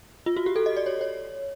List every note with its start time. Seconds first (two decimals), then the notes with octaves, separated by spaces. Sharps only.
0.26 F4
0.37 F#4
0.46 G4
0.56 A4
0.66 D#5
0.77 D5
0.86 C#5
1.01 C#5